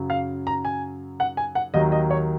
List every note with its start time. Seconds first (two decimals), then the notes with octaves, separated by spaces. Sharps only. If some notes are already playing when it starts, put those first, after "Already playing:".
Already playing: F#2 C#3 F#3
0.10 F5
0.47 A#5
0.65 G#5
1.20 F#5
1.37 G#5
1.55 F#5
1.74 D#2 D#3 F#3 D#5
1.92 D#5
2.11 C#5